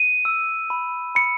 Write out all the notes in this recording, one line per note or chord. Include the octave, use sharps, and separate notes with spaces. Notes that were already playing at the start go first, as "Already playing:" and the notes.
Already playing: D#7
E6
B5
B5 C#7